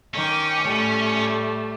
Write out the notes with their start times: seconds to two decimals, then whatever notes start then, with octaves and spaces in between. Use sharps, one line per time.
0.14 D#3 C#4 G5 D6
0.66 A2 G3 A3